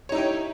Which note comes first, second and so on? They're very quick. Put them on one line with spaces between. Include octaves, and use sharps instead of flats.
C#5 D#4 E4 G4